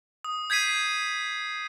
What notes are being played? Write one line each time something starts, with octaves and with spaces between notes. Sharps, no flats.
D#6
G6 G#6 B6 C7 D#7